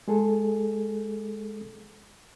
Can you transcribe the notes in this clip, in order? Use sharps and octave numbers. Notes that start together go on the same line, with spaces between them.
G#3 G#4 A4